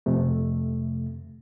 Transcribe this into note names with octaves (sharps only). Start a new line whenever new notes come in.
F2 C3 A3